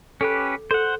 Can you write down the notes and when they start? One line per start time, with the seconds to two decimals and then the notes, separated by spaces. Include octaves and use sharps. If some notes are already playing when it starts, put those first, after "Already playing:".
0.21 C#4 G4 A4 B4 D6
0.71 A4 C5 F#5